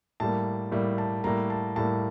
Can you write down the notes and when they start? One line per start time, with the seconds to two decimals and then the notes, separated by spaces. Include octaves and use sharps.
0.20 A2 G3 A#3 A5
0.71 A2 G3 A#3
0.98 A5
1.24 A2 G3 A#3 A#5
1.50 A5
1.76 A2 G3 A#3 A5